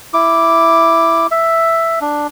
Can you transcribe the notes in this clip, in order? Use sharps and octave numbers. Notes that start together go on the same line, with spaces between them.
E4 D6
E5
D4